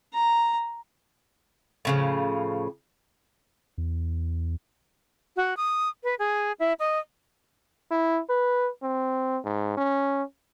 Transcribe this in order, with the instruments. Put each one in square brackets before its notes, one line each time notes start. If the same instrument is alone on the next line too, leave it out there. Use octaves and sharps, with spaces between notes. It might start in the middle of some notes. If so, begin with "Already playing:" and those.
[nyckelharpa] A#5
[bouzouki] A2 C#3 F3
[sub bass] E2
[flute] F#4
D#6
B4
G#4
E4
D#5
[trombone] E4
B4
C4
G#2
C#4